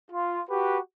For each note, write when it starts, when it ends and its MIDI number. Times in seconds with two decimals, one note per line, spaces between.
0.11 0.41 65
0.50 0.80 66
0.50 0.80 67
0.50 0.80 71